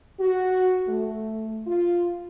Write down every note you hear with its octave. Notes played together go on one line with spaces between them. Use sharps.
F#4
A3
F4